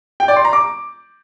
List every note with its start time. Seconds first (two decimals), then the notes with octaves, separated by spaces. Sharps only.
0.20 G5
0.28 D5
0.36 C6
0.45 A#5
0.53 D6